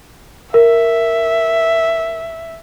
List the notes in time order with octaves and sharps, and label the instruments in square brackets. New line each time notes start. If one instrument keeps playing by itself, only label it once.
[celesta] A#4 [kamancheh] E5